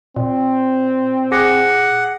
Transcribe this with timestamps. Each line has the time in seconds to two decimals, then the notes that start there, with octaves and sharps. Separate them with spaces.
0.16 A#2 C4
1.32 G#4 F#5 D6 A#6